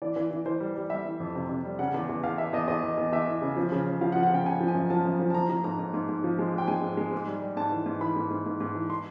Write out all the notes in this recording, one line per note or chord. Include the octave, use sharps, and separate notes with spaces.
E3 D5
E3
E3
E3 C5
G3
G3
G3 E5
E3
F2
C3
C3
G3
C#3 F#5
E2
E2
E2 F5
E2 E5
E2 D#5
E2 D#5
E2
E2
E2 E5
E3
C#3
F3
C#3
C#3
F3 F5
F#5
F3
F#5
C#3 G5
C#3 G#5
F3
G#5
F#2
F3 A5
F#2
F3
A5
F3 A#5
F3 A#5
G#2 A#5
G#2
G#2
G#2
F3
G#3
G#2
G5
G#3 G#5
G#2
G#3
G#2
G3
G3
G#2 A5
E3
G#2
E3 B5
G#2
G#2
G#2
G#2
E3
C6